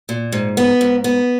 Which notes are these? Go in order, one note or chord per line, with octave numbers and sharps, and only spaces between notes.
A#2
G#2
B3
G#2
B3